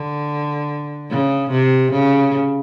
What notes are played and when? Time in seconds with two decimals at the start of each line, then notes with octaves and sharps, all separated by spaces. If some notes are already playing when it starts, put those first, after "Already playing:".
Already playing: D3
1.10 C#3
1.50 C3
1.92 C#3